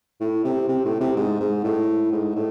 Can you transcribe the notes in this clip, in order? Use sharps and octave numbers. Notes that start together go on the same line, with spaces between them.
A2
C3
C3
A2
C3
G#2
G#2
A2
G#2
A2